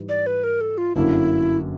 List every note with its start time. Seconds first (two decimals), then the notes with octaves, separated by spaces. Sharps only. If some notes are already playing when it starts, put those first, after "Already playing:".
Already playing: G#2 E3 G3
0.09 D5
0.27 B4
0.44 A#4
0.61 A4
0.78 F4
0.96 G1 F#2 D3 F#3 A#3 E4